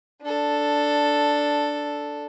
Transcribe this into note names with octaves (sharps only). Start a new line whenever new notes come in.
D4 A4